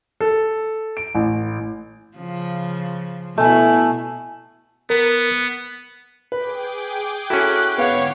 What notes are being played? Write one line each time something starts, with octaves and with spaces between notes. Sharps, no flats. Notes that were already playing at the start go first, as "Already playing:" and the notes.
A4
D7
A1
C#3 F3
B2 A3 E4 G#5
B3 A#4
G#4 B4 G5 D6
C#4 E4 F#4 A4 F#6
G#2 D3 B3 C#5 F5 F#5